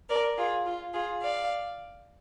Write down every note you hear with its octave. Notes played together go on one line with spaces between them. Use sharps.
A#4 D5
F4 G#4
F4
F4 G#4
D5 F5